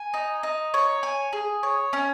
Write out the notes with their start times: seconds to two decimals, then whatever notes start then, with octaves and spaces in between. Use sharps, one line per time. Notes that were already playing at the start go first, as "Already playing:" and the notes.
Already playing: G#5
0.14 D#4
0.43 D#4
0.74 C#5
1.03 G#5
1.33 G#4
1.63 C#5
1.93 C#4